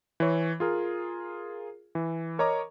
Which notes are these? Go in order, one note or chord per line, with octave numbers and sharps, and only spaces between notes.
E3 C#5
F4 G#4 A#4
E3
A#4 C#5 D#5 A#5 C#6 D6